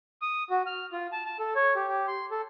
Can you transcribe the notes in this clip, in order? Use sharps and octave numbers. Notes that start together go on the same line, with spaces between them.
D#6
F#4
F6
F4
A5
A5
A4
C#5
G4
G4
C6
A4